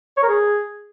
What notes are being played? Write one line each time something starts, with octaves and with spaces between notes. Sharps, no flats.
C#5
A#4
G#4